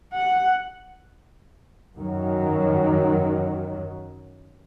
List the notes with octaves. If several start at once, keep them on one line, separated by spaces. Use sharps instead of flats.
F#5
F#2 D#3 F#3